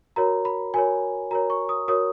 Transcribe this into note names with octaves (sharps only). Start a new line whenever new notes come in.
F#4 A#4 C#5 A#5
B5
F#4 A#4 C#5 G#5
F#4 A#4 C#5 A#5
C#6
D#6
F#4 A#4 C#5 D#6